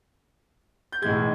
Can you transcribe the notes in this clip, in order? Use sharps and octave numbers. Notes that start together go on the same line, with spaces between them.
G6
B1 A2 E3 G#3 G#6